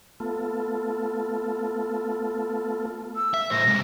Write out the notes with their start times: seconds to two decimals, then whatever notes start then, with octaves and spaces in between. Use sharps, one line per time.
0.20 A3 B3 F4 A4
3.16 E6
3.34 E5
3.51 A2 C5 A#6
3.66 C3 G#3